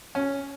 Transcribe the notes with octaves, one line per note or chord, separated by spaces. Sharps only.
C#4